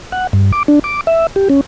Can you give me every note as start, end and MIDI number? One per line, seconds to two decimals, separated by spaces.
0.12 0.27 78
0.33 0.52 43
0.53 0.63 86
0.68 0.79 62
0.84 1.01 86
1.07 1.27 76
1.36 1.48 67
1.50 1.61 61